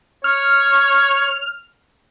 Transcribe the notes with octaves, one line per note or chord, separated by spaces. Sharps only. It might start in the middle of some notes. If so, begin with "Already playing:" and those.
C#5 F6